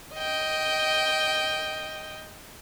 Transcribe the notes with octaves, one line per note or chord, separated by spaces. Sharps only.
D#5 G5